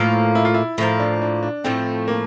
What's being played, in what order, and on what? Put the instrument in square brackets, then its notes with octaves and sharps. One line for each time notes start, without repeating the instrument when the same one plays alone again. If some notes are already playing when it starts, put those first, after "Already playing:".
Already playing: [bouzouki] A2 F3 A#3 [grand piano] F4
[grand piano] E4
F4
E4
[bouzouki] A2 F3 A#3 [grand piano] E4
[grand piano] D4
D4
D4
[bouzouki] A2 F3 A3 [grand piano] C4
[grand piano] A#3